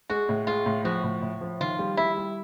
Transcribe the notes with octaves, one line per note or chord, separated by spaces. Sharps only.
G#3 F#4
A2
G#3 F4
A2
F3 F#4
A2
A2
F3
D#3 F4
G3
G3 E4
G3